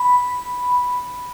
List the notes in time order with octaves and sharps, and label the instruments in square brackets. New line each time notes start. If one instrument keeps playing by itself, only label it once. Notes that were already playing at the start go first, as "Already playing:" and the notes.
Already playing: [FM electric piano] B5